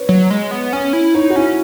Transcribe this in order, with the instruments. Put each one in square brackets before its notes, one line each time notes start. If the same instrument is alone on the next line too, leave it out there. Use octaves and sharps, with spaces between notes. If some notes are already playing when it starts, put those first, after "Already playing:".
Already playing: [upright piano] B4 C#5
[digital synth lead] F#3
G#3
B3
[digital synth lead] C#4 [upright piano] C#5
[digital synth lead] E4
[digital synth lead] D#4 [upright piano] C#5
[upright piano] F#4
[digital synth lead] C#4 [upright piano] E4